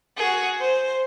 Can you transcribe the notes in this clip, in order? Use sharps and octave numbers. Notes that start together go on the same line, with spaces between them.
F#4 G#4
C5